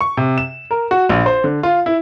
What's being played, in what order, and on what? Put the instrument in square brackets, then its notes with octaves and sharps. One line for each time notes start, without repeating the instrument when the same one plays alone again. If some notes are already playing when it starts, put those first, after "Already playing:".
[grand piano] C#6
C3
E7
A#4
F#4
A#1
C5
D3
F4
E4